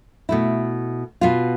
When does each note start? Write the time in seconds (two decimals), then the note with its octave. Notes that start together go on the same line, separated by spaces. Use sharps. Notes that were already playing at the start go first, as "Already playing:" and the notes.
0.29 B2 A3 E4
1.21 B2 B3 F4